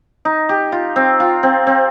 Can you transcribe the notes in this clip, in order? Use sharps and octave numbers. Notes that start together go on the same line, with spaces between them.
D#4
G4
F4
C4
F4
C4
C4